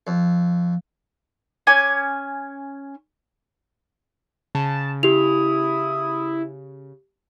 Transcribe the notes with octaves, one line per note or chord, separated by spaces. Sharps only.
F2
C#4 G#5 D6
C#3 A5
E4 G4 D#6 F7